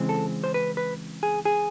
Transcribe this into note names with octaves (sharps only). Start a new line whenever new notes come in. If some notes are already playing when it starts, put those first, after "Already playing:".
Already playing: C#3 E3 G#3 C4
A4
C5
B4
B4
G#4
G#4